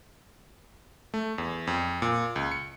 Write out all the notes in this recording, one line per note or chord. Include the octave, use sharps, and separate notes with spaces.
A3
E2
F2
A#2
C#2
C#7